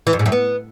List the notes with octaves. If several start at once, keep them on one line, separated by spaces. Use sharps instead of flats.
E3
F2
G#2
F#2
B3